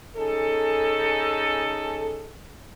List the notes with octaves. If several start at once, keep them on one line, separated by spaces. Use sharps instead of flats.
C#4 D#4 G#4 A4